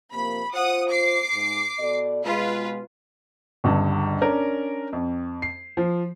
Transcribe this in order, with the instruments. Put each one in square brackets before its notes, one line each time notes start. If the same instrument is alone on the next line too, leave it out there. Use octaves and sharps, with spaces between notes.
[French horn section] C3 F3 A#3 [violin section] B5
[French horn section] F4 C5 [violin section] F#5 D#6
[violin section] D6 C7
[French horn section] G#2
B2 A4 D5
[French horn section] B2 G#3 [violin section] F4 B4
[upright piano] G1 C#2 G2
C#4 D4 A#4
F2
C7
F3